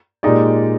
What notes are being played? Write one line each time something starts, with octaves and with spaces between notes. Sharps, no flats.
A#2 G#3 D#4 G4 D5